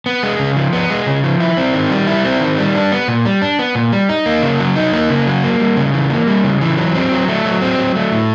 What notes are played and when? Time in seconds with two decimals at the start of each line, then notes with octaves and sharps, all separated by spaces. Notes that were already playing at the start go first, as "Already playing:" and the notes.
0.06 B3
0.23 G#3
0.39 C#3
0.56 F3
0.73 B3
0.90 G#3
1.07 C#3
1.24 F3
1.40 E4
1.57 C4
1.74 D#3
1.91 G3
2.07 E4
2.25 C4
2.41 D#3
2.58 G3
2.75 D4
2.92 B3
3.08 A#2
3.25 G3
3.42 D4
3.59 B3
3.75 A#2
3.92 G3
4.09 D#4
4.26 A#3
4.43 C#3
4.60 F#3
4.76 D#4
4.93 A#3
5.09 C#3
5.27 F#3
5.43 A#3
5.60 G3
5.77 C#3
5.94 E3
6.10 A#3
6.27 G3
6.44 C#3
6.61 E3
6.78 F#3
6.95 C4
7.12 F#3
7.28 A3
7.45 F#3
7.61 C4
7.79 F#3
7.96 A3
8.12 A2